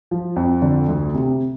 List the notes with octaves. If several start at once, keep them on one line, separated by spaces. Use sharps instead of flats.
F3
F2
D3
D2
C3